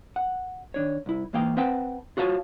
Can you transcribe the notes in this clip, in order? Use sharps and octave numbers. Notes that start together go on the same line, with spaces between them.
F#5
D#3 D4 C#5
C2 E4
G#2 E3 A#3 F5 G5
C4 B4 F#5 G5 A5
F4 F#4 C#5 F5 A5